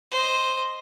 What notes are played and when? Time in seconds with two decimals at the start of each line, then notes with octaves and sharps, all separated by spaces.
0.11 C5 D#5